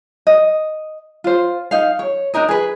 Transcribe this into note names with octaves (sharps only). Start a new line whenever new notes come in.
D#5
F4 C5
D#4 F5
C#5
D4 D#4 A#4 D#5
G#4 B4